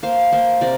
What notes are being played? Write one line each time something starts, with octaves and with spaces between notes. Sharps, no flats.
A#3 C5 F5
A#3 C5 F5
C3 A#4 D5